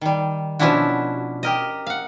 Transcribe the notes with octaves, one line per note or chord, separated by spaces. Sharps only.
D#3 G3
B2 F3 C#4 D4 E4 F#4
G4 A#4 D#5
F5 F#5